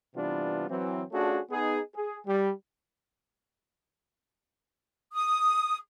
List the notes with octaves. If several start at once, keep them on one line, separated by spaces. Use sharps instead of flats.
C3 E3 G3 B3 D4 F4
E3 F#3 C4
A3 C#4 D4 F4 F#4 G#4
B3 D#4 G#4
G#4
G3
D#6